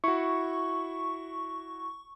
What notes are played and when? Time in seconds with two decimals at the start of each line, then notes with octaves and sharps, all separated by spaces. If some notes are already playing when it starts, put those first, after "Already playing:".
0.04 E4 F#4 C#6